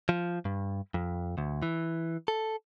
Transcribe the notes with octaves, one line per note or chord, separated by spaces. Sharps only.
F3
G2
F2
D2
E3
A4